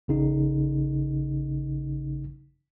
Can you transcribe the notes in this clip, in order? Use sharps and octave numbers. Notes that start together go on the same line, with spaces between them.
A1 C#3 D#4